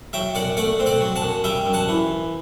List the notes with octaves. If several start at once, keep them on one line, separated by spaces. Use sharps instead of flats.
F#3 E5 G5
F#2 D5 F#5
A3 D5 F#5
C4
D5 F#5
F#3
F#5 A5
F#2
G3 E5 G5
F#2
F#5 A5
E3